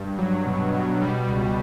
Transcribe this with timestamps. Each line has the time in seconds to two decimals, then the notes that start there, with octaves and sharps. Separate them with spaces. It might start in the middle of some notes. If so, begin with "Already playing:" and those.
Already playing: G2
0.18 F#3
0.46 B2
0.74 B2
1.01 G3
1.28 C#2